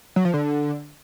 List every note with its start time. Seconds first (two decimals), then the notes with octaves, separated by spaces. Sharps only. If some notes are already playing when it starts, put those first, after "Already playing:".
0.16 F#3
0.25 F3
0.34 D3